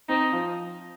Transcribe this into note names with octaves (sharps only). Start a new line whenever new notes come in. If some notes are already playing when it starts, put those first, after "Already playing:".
C4 D#4
F3 F4